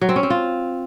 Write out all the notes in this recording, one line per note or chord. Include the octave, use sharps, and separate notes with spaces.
F#3
C4
C#4
C4
F4